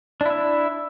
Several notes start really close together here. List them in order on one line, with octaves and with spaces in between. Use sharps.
D4 E4 E5